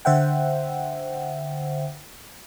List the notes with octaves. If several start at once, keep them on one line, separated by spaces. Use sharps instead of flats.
D3 C5 E5 F#5 G5